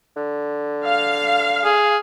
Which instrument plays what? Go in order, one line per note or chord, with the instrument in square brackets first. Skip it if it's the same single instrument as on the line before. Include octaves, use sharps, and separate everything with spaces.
[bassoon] D3
[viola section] F5
[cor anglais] G#4